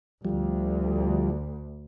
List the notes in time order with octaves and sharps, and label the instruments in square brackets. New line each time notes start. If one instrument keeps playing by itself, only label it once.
[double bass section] D2 [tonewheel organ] F3 G3